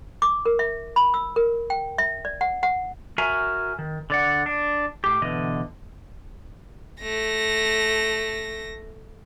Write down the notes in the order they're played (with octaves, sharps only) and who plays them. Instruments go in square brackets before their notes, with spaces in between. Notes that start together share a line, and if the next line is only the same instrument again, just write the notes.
[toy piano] D6
A#4
E5
B5
E6
A#4
G5
E5
D5
F#5
F#5
[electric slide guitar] F#4 A#4 E5 G#5 A#5
D#3
D3 D5 F#5
D4
A2 G4
B2 D3 E3 D#5
[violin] A3 A#6